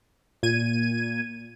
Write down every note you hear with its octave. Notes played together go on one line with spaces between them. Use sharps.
A#2 G#6 D#7